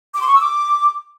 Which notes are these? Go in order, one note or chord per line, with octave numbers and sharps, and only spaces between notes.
D6
C6
C#6
E6
D6